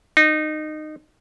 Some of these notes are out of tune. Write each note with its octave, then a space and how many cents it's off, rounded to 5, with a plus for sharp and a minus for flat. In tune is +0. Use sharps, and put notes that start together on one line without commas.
D#4 -20